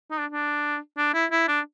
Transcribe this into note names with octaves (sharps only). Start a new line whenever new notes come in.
D#4
D4
D4
D4
E4
E4
D4